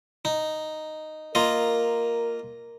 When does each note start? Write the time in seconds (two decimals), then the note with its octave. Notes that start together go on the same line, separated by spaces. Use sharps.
0.25 D#4
1.35 A#3 F4 A#4 D#5